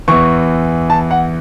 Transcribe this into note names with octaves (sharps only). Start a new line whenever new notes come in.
E2 E3 C#6
A5
F#5